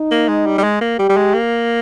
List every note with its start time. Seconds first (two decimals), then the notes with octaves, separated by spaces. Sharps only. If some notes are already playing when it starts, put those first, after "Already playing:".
Already playing: D#4
0.11 A#3
0.28 G#3
0.46 G3
0.58 G3
0.63 G#3
0.81 A#3
0.99 G3 G4
1.09 G3
1.17 G#3
1.34 A#3